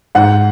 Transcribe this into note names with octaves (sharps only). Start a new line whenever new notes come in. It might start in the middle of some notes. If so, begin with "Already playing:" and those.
G#2 F#5